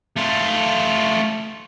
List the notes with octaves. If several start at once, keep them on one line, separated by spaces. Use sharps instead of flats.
A3 F4